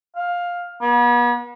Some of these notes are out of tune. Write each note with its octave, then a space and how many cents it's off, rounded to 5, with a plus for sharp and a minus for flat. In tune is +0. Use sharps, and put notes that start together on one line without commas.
F5 +10
B3 -40